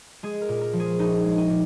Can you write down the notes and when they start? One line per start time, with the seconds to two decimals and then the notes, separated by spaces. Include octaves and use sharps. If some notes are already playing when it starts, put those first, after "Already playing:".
0.23 G#3 G#4
0.42 A#4
0.49 A#2
0.61 A#4
0.73 F3
0.80 G#4
0.99 A#1 D#4
1.24 G#3
1.38 D#4
1.50 A#2